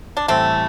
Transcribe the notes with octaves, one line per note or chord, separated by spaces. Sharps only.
D4
A2 E3 G3 A3 C4